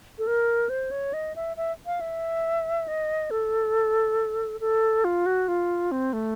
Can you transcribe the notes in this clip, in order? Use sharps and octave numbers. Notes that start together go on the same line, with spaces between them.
A4
A#4
C5
C#5
D#5
E5
E5
F5
E5
D#5
A4
A4
F4
F#4
F4
C4
A3